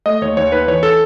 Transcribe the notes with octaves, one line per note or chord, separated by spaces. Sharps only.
A3 D#5
D#2 C#5
D#2 C#5
D#3 B4
E3 C#5
A4